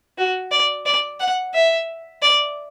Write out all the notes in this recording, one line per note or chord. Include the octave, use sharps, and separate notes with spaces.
F#4
D5
D5
F#5
E5
D5